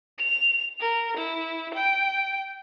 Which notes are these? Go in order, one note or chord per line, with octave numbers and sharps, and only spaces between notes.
F7
A#4
E4
G5